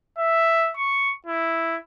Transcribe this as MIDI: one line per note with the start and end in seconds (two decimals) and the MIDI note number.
0.18 0.72 76
0.77 1.12 85
1.26 1.78 64